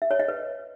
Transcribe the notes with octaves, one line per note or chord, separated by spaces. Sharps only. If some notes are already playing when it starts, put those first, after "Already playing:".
E5
C#5
D#5
B4